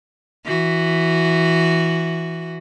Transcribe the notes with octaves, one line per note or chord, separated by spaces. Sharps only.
E3 F#4